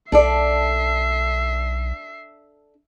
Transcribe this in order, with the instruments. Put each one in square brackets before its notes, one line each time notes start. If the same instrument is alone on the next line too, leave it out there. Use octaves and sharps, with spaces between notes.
[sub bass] B1 [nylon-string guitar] D4 A4 D5 [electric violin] E5 C7